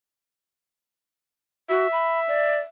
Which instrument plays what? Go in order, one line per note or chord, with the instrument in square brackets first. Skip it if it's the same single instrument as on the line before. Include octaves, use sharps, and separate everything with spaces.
[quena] F#4 [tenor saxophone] E5
[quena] B5
D5